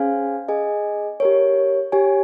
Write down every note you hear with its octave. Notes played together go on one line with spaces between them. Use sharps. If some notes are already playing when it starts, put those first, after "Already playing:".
Already playing: C#4 G#4 C5 F5 G#5
G#4 D#5 G#5
G4 A#4 C#5
G4 C#5 G#5